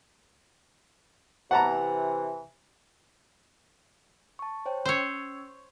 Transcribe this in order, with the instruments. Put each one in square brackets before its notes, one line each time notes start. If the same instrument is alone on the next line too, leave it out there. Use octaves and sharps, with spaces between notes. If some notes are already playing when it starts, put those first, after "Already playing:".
[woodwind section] C3 E3 [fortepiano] F#5 A5 A#5
[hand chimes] A5 C#6
C5 C#5 G5
[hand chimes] C#4 E6 [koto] C5 C#5